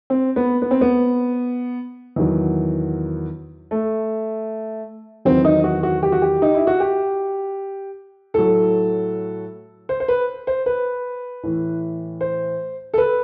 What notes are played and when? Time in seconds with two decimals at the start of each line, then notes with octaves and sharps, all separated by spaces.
0.10 C4
0.36 B3
0.62 B3
0.71 C4
0.81 B3
2.16 E2 D#3 F#3
3.71 A3
5.25 E2 D#3 F#3 C4
5.45 D#4
5.64 F#4
5.83 F#4
6.03 G4
6.12 F#4
6.22 G4
6.42 D#4
6.55 E4
6.67 F#4
6.80 G4
8.34 A2 F#3 A4
9.89 C5
10.00 C5
10.08 B4
10.47 C5
10.66 B4
11.43 A2 E3
12.21 C5
12.94 A4
12.98 B4